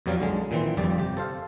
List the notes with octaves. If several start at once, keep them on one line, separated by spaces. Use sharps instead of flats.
F2 B2 F#3 G3 F5
B1 D3 G#3
A#2 D#3 E3 C4
G1 F2 G3 D5
C3 G4
A4 C5 F5